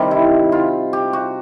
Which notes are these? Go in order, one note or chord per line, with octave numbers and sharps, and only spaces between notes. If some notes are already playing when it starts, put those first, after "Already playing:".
Already playing: C3 D#3 G3
E4
F4
G4
F#4